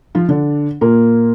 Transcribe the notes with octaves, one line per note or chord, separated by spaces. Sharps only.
F3 F4
D3 D4
A#2 A#3